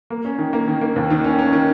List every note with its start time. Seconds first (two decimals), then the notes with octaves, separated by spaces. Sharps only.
0.10 A#3
0.25 C#4
0.39 D#3
0.53 A#3
0.68 D#3
0.81 A#3
0.96 D#2
1.10 D#3
1.24 C#4
1.39 C#4
1.53 D#3